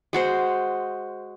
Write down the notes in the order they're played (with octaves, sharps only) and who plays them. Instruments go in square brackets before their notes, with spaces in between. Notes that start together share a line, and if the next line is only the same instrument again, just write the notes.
[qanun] G#3 F#4 C5